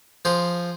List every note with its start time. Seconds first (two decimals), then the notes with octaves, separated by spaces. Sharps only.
0.25 F3 G#4 C5